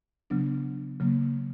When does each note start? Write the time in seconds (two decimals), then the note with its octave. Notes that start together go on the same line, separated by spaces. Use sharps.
0.30 C#3 F#3 B3 D4
1.00 C#3 F#3 A#3